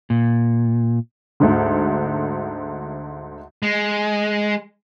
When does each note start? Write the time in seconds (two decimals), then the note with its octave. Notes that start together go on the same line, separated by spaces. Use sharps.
0.10 A#2
1.40 D2 G#2 D3
3.63 G#3